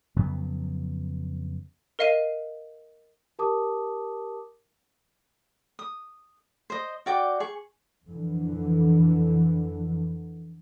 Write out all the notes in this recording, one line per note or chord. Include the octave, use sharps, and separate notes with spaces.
F2 C#3 F#3 B3
A#4 D#5 F5 C7 D#7
G4 A#4 A5 D6 D#6
D#6
C5 D#5
F#4 D5 G5 D6
G#4 C#6
F2 D3 E3